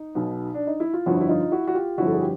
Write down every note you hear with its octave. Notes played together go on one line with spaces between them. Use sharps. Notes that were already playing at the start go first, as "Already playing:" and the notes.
Already playing: D#4
B1 B2
D4
D#4
E4
F4
G1 F2 D3 E4 F#4
E4
D#4 F4
E4 F#4
F#4
F4 G4
G1 F2 D3 E4 F#4
A4
G#4
G4